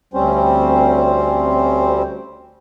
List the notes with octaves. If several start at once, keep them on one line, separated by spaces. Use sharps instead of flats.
D2 G3 C4 C#4 C5